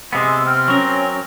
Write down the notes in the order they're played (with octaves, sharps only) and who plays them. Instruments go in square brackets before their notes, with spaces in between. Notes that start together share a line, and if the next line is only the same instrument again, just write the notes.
[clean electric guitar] C3 B3 [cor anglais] G#3 [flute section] E6
[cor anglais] C4 [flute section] F6
[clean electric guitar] F#3 A#4 [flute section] C#4